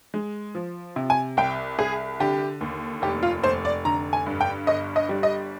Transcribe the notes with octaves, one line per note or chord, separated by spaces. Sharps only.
G#3
F3
C3
G#5
C2 G5
C2 G#4
D3 G4
D#2
F1 G4
F4
F1 C5
D5
D3 A#5
G#5
G2
G5
G1 D#5
D#5
G3
D#5